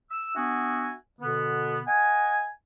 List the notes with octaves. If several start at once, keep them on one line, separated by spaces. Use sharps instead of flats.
E6
B3 D4 F#4 E5 G#5
B2 D3 B3
D#5 F#5 G#5